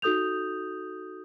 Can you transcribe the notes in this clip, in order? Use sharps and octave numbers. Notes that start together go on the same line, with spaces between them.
D#4 F#4 A4 D#6 G6 F7